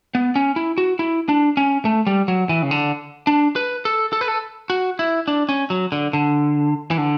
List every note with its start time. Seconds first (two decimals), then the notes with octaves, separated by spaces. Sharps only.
0.15 B3
0.36 C#4
0.56 E4
0.78 F#4
0.99 E4
1.29 D4
1.57 C#4
1.85 A3
2.07 G3
2.28 F#3
2.49 E3
2.62 C#3
2.71 D3
3.27 D4
3.56 B4
3.85 A4
4.13 A4
4.21 B4
4.28 A4
4.70 F#4
4.99 E4
5.28 D4
5.49 C#4
5.70 F#3
5.92 D3
6.13 D3
6.91 E3
6.98 D3